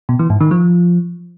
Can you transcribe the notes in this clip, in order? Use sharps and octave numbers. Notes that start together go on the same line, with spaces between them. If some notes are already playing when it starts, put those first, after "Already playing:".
B2
E3
G#2
D#3
F3